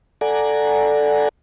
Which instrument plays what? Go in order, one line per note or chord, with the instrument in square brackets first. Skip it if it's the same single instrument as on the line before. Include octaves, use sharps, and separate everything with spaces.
[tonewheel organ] A4 D5 F#5 G#5 A#5